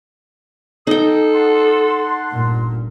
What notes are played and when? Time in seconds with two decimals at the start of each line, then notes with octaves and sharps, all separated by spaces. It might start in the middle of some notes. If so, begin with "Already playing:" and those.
0.87 D#4 A4 G5 D#6
1.34 F#5 A5 C6
2.31 G1 A#2